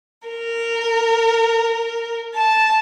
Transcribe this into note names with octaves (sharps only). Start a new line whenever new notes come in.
A#4
A5